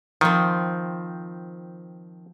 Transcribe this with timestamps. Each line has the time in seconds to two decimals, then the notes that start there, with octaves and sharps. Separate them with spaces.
0.21 D#3 F3 C4